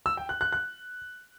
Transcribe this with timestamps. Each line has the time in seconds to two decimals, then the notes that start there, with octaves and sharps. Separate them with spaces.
0.06 E6
0.17 G5
0.29 F#6
0.41 F#6
0.53 F#6